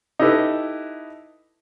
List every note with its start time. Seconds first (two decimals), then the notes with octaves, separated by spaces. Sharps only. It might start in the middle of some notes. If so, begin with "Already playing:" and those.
0.19 D#4 E4 G4 A4 B4